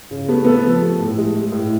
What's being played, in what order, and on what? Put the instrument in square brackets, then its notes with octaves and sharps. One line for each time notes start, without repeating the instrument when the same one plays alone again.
[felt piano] C#3
[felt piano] A3 [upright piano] B3
[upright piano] B3 [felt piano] A4
[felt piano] F3
A3
A2
G#3
G#3
A2